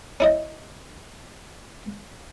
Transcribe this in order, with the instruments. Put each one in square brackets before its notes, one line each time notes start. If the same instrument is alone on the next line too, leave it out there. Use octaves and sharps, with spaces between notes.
[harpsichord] C#4 E4 D#5